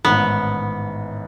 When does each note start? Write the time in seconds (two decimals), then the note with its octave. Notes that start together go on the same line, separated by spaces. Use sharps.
0.04 A1 G#2 D#3 B3